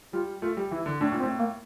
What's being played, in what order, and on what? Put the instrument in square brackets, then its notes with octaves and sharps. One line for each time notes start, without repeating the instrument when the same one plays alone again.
[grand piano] G3 [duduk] F4
[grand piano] A3 [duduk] F4
[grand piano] G3
[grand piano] E3 [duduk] E4
[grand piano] D3
[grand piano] A2 [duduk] D4
[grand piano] A#2
[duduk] C4
[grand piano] A2
[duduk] A#3